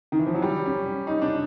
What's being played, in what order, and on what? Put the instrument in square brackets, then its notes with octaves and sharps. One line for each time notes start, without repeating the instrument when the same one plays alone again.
[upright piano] D#3
E3
F3
F#3
G3
C#4
D#4
D4